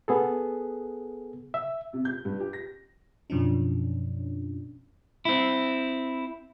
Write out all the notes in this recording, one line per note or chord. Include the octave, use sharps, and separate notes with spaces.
B3 G#4 A4
E5
C3
G6
G2
G4
A#6
F#2 B2 F3 C#4 D4
C4 E4